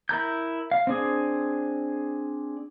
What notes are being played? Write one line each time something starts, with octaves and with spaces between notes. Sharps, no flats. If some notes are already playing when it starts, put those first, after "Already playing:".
E4 A#4 A#5 G6
F5
C4 D4 G#4